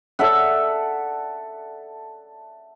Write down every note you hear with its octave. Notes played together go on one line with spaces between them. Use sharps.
A4 D5 E5 F#5